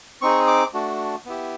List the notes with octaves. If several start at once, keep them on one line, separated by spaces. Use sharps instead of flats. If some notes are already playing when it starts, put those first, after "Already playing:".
C4 D#4 G#4 C#6
D6
A3 D4 F#4
B3 E4 G4